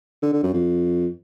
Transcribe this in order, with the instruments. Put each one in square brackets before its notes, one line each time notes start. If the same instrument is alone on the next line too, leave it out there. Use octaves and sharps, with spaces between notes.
[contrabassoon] D3
D3
F#2
F2